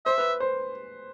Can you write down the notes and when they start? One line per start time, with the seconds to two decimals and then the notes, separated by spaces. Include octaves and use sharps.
0.06 C5 E5
0.18 B4
0.40 C5